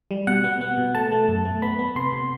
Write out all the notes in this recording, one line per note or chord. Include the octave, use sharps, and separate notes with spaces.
G3
B2 F#5
B3
B3
B2
A3 A5
A3
F#2
A3
B3 B5
B3
C3 C6
C3